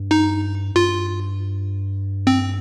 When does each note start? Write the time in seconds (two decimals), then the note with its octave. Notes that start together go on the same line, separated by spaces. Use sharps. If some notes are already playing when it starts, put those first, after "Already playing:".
Already playing: G2
0.11 D#4
0.75 G2 F4
2.27 C4